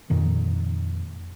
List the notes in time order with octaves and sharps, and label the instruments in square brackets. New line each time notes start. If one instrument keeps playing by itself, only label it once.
[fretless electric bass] F2 A#2 D#3